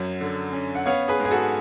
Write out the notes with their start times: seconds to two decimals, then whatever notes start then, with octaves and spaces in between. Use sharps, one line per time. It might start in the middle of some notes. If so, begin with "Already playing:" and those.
Already playing: F#2 F#3 C#5
0.21 D3
0.53 C#4
0.75 F#5
0.86 B3 C#5 F5
1.08 G#4 B4
1.20 G#2
1.25 G#4
1.31 F#4 A4